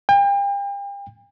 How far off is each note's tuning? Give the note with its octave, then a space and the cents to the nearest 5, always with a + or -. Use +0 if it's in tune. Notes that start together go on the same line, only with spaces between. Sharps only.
G5 +35